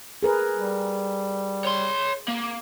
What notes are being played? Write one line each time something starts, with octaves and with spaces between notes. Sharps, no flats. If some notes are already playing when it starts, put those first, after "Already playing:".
G#4 A#4 B4
G3
C#5 C6
A#3